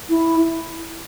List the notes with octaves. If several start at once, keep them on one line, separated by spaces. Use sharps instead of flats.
E4